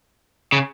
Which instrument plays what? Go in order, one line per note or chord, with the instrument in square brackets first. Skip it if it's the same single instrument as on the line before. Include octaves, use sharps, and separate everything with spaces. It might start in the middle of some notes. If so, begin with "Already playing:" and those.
[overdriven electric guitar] C#3